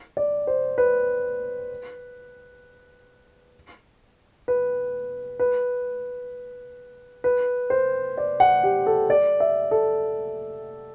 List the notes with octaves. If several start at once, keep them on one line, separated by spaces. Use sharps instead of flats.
D5
C5
B4
B4
B4
B4
C5
D5
F#5
G4
A4
D5
E5
A4